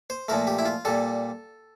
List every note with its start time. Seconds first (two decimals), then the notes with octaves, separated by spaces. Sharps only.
0.10 C5
0.28 A#2 F3 A3 A#4
0.47 G4
0.59 E4
0.66 F4
0.85 A#2 G3 A4